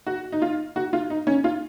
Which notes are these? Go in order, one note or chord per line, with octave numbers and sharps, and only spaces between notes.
F#4
D#4
F4
F#4
F4
D#4
C#4
F4